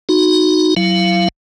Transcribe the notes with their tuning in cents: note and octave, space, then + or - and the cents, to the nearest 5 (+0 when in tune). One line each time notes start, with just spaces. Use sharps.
D#4 +0 F#4 -10
F#3 +10 E4 +15 F5 -15